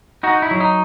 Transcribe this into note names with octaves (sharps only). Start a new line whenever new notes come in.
D#4 F#4
E4
F#3
D#4